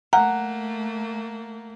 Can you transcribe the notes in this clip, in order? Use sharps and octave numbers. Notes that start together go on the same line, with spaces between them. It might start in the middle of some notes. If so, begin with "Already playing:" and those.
A3 A#3 F#5 A#5